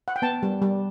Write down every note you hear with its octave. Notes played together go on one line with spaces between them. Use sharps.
F#5
G5
B3 A5
G3
G3